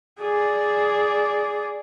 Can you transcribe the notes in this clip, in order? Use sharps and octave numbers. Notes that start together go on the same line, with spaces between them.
G#4 D5